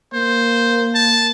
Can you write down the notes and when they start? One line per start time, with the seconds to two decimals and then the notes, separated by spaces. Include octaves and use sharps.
0.13 A#3 C5
0.95 A5